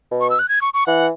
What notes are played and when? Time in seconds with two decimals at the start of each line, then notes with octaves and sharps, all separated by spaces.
0.11 B2
0.21 C#6
0.30 E6
0.39 F#6
0.49 G#6
0.62 C#6
0.74 C#6
0.87 E3 F#5